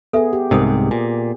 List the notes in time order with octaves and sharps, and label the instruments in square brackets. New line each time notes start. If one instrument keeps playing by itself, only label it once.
[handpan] B3 G#4 [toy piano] A4 E5
[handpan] G4
[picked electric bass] C2 G#2 C3 [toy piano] A#4 C5 D#6
[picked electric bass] A#2 [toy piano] G#5